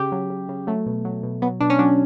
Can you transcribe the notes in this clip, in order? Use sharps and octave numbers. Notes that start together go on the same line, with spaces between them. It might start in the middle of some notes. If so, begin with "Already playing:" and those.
Already playing: C#3 G4
F#3
C#3
C#3
F#3 A3
B2
F#3
B2
F#3 B3
B2 D4
C#4
F#3 D4